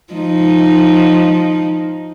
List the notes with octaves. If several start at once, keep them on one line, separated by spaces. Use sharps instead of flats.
F3 D#4